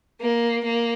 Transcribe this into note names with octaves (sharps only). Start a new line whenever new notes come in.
A#3
A#3